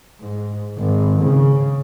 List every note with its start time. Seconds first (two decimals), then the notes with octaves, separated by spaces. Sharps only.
0.20 G#2
0.78 G#1
1.23 C#3